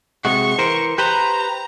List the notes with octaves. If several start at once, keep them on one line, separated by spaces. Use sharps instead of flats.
C3 G#3 F#4 C#6
E3 A#4 C5
G4 B4 C5 A#5